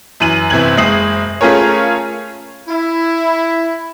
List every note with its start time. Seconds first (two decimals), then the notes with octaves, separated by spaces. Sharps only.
0.20 F#2 E3 D#7 F#7
0.50 G1 C3 E3 G#6 F#7
0.77 F#1 G#3 D#6 C7 F#7
1.41 A3 C#4 F4 G#4 A#4 C#5
2.68 E4